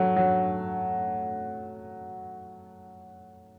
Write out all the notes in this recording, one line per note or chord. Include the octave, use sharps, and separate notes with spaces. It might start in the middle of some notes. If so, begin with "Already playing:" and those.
Already playing: F#3 A3
F#3